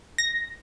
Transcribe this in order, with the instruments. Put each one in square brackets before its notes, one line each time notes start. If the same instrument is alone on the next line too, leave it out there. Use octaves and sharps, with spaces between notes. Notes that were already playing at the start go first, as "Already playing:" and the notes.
[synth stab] A#6